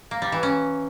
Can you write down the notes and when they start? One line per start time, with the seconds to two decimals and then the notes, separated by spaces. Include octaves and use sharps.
0.11 A#3
0.22 G3
0.32 E3
0.43 C#4